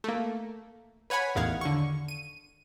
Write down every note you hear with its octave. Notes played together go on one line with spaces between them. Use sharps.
A3 A#3
B4 C#5 F#5 G#5 B5
A1 E2 D#3 F5 F#5 G#6
D3 C#6
D#7